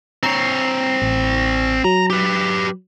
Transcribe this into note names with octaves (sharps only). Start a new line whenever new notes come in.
C4 C#5 A#5 C7
A1
F#3 A#5
G4 B4